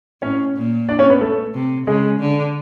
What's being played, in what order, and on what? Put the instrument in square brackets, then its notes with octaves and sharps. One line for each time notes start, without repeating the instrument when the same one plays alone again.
[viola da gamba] A2 [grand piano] C#4 C#5
[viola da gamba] A#2
[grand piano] D4 D5
C#4 C#5
B3 B4
A3 A4
[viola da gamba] C3
[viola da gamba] C#3 [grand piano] G#3 G#4
[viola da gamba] D3